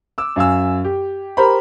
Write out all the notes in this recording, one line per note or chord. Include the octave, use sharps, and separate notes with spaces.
D6 E6
F#2 F5 G#5 E6
G4
G4 A#4 C5 A#5 B5